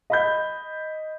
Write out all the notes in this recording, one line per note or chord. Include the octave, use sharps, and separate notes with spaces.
D#5 B5 G6